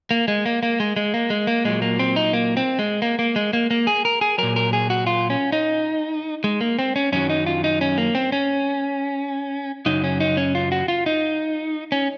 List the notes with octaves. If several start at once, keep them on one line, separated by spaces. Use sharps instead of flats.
A#3
G#3
A#3
A#3
G#3
G#3
A#3
G#3
A#3
A#2 F#3 G#3
A#3
C4
D#4
A#3
C4
G#3
A#3
A#3
G#3
A#3
A#3
G#4
A#4
G#4
A#2 F#3 A#4
A#4
G#4
F#4
F4
C#4
D#4
G#3
A#3
C4
C#4
F#2 D#3 F#3 C#4
D#4
F4
D#4
C#4
A#3
C4
C#4
F#2 C#3 F#3 D#4
C#4
D#4
C#4
F4
F#4
F4
D#4
C#4